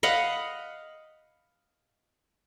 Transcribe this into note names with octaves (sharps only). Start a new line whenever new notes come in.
D#5 F5 F#5 B5